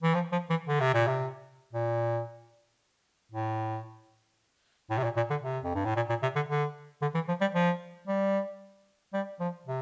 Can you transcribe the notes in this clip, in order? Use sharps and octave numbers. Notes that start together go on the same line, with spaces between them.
E3
F3
F3
E3
D3
C3
A#2
C3
A#2
A2
A2
C3
A#2
A#2
D3
C3
F2
G2
A2
A#2
A#2
C3
D3
D3
D3
E3
F3
G3
F3
G3
G3
F3
C3